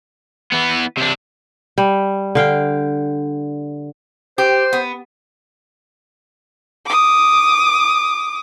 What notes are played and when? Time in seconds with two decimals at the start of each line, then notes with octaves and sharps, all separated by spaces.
0.52 E3 B3
0.97 C3 D4
1.78 G3
2.35 D3 F5 G5
4.38 G4 C5
4.73 B3
6.86 D6 D#6